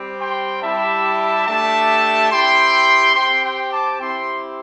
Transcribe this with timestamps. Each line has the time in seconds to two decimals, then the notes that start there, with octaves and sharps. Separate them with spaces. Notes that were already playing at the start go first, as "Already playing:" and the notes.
Already playing: G3 C4 G4
0.20 G5 C6
0.63 G3 E4 G4 E5 A5
1.47 A3 D4 G4 E5 A5
2.31 C4 E4 G4 G5 C6
3.15 C4 G4 G5 C6
3.44 G5 C6
3.72 A5 D6
4.00 C4 E4 G4 G5 C6